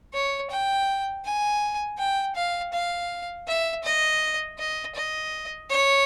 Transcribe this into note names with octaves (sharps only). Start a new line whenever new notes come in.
C#5
G5
G#5
G5
F5
F5
E5
D#5
D#5
D#5
C#5